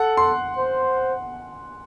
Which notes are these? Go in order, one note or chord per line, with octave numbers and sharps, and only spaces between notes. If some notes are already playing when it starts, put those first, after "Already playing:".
Already playing: A4 F#5
C6
C5